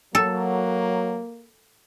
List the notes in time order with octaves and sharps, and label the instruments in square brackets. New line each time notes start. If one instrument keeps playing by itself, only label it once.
[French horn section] F#3 [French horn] A#3 [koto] A4